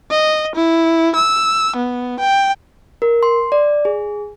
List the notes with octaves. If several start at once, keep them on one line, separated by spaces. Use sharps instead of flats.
D#5
E4
E6
B3
G5
A#4
C6
D5
G#4